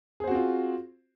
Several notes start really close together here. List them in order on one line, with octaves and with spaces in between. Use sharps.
G#4 C5 F#4 C4 F4